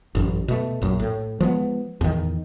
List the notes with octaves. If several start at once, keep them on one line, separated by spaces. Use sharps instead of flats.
A1 F#2
B2 A3
A#1 F#2
A2
F3 G#3 A3 B3
E2 A2 D#3